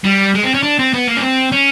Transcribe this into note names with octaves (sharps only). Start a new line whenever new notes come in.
G3
G#3
C4
C#4
D4
C4
B3
A#3
C#4
C4
C#4